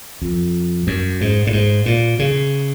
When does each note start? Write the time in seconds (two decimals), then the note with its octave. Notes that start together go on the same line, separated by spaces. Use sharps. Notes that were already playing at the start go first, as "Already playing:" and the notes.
0.21 F2
0.87 F#2
1.21 G#2
1.47 A2
1.52 G#2
1.86 A#2
2.19 C#3